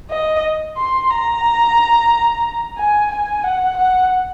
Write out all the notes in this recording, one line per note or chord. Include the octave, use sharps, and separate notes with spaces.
D#5
C6
A#5
G#5
G#5
F#5
F#5